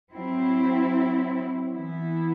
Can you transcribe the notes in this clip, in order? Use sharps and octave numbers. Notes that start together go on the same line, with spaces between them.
F#3 C4 E4
E3 B3 E4